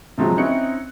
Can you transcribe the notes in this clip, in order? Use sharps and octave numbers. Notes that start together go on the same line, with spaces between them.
C3 F3 F#3 G#3
C4 C#4 D#4 E4 F#6 C#7